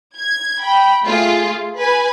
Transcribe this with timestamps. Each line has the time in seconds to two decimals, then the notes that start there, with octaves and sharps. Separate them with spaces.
0.18 G#6
0.62 G5 B5
1.05 A3 F4 G#4
1.77 B4 G#5